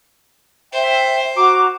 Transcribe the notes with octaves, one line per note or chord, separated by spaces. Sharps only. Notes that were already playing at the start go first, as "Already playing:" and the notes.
C5 E5 G5
F#4 A#5 D6